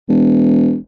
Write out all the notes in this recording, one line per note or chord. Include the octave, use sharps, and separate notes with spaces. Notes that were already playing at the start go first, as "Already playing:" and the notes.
E1